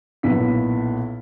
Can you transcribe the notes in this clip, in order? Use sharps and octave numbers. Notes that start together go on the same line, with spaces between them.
B1 A#2 B3 E4 B6